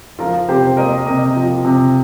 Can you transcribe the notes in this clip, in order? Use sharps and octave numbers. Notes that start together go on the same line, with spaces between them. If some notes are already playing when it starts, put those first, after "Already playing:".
F3 F4 A#4
C3 G4 C5
A#3 A#4 D#5
C3 A#4 D#5
F3
C3